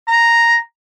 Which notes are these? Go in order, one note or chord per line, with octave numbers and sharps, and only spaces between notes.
A#5